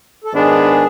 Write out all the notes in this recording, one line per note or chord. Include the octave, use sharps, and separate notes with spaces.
A4
G#2 D#3 G#3 B3 D4 G#4